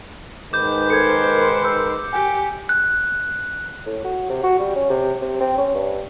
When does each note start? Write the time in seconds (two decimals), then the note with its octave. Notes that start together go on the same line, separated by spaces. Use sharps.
0.53 G#2 D#3 B4 D6 G6
0.90 A4 A#4 C5 G#6 C#7
1.65 E6
2.13 G4 G#5
2.69 F#6
3.86 A2
4.04 F#4
4.29 C3
4.43 F#4
4.59 G3
4.75 C#4
4.90 C3
5.21 C3
5.40 C4
5.58 C#4
5.74 G2